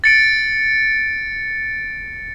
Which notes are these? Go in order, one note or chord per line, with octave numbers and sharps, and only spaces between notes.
A6 C#7 D7